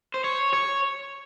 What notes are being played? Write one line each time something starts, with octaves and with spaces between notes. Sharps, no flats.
C5
C#5
C#5